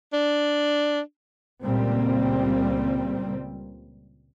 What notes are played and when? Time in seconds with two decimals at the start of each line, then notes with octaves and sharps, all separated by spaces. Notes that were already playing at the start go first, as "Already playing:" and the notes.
0.13 D4
1.64 C#2 A#2 G3 A#3 C4